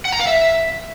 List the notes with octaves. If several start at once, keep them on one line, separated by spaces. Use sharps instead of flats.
F#5
A#5
F5
E5